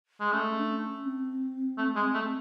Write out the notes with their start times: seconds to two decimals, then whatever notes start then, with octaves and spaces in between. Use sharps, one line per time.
0.20 G#3
0.32 A3 C#4
0.58 D4
0.69 C#4
1.06 C4
1.78 A3
1.96 G#3
2.14 A3